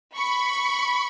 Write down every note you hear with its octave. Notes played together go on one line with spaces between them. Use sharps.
B5 C#6